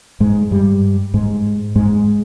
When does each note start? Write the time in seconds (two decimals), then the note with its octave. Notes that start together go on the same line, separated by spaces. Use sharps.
0.20 G#2 G#3
0.51 G2 G3
1.14 G#2 G#3
1.76 G#2 G#3